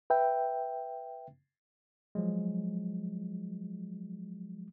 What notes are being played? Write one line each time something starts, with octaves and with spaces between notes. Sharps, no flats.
B4 E5 G5
F3 F#3 G#3